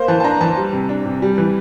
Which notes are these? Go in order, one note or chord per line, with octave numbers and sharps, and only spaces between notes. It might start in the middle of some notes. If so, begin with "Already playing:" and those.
Already playing: A#3 C5
E3 A5
A5
D4 A#5
E3 A5
G3
C3
D4
C3
G3
E3